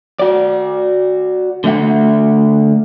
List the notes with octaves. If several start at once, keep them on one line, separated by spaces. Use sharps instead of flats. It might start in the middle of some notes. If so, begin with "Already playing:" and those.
F#4 D5
D3 A3 E5 F#5